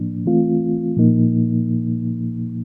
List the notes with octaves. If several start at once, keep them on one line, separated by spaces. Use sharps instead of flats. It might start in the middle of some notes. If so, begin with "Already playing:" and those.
Already playing: A2 F3 A#3 D4
E3 A3 C4 F4
A#2 F3 A#3 D#4